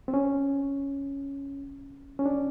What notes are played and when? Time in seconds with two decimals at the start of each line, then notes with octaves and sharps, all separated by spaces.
0.08 C4
0.14 C#4
2.19 C#4
2.26 D4